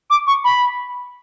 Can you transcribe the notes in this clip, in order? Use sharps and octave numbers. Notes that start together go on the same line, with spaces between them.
D6
C#6
B5